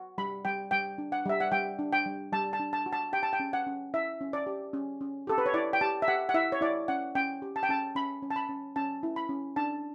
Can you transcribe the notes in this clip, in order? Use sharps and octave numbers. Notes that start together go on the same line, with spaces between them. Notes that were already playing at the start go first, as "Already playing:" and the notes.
Already playing: F#4
G3 B5
G3 G5
G3 G5
D4
F#5
G3 E5
F#5
G3 G5
D4
G5
G3
G3 A5
A5
D4
A5
F#4
A5
G4 G5
A5
G5
C#4
F#5
C#4
E4 E5
C#4
D5
G4
C#4
C#4
G4 A4
B4
C#5
E4 D5
G5
G4 A5
E5
G4 F#5
F#5
E4 E5
C#5
E4 D5
C#4 F#5
C#4 G5
G4
A5
G5
C#4 A5
C#4 B5
C#4
A5
B5
C#4
C#4 A5
E4
B5
C#4
D4 A5